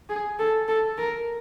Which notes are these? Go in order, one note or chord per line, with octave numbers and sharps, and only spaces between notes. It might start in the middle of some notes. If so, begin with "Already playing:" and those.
G#4
A4
A4
A#4